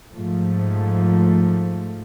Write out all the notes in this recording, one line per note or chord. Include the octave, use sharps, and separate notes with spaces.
G#2 F3 A3